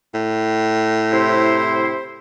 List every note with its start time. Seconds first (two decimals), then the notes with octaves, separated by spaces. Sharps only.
0.14 A2
1.12 C3 E4 C5